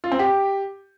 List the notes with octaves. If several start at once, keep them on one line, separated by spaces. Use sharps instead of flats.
F4
C4
G4